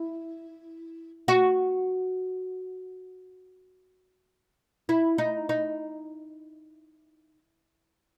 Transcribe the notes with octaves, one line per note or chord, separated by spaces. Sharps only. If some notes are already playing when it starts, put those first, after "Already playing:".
Already playing: E4
F#4
E4
D#4
D#4